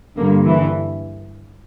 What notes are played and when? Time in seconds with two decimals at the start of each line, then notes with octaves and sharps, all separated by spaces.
0.16 G2 D3 A#3
0.45 E3